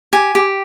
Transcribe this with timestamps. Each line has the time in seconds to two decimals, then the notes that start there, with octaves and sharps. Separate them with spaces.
0.13 G4 G#5
0.35 G4